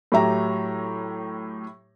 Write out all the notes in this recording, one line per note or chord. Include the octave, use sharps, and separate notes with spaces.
A2 F#3 G4 E5 A#5